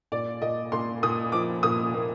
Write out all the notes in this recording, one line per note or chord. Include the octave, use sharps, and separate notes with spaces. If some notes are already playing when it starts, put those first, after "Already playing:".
A#2 D5
A#2 D#5
A#2 C6
A#2 D#6
F3 D6
A#2 D#6
A#3